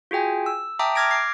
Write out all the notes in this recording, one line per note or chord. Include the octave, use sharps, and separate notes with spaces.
F4 F#4 G#4 G5 G#5
E6
E5 G5 A5 A#5 D6 D#6
D6 F6 G#6 A#6 D7
D6 G#6 C7